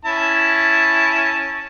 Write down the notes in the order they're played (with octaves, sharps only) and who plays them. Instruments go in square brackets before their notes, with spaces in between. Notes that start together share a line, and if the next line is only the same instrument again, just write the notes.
[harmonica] C#4 E4 A5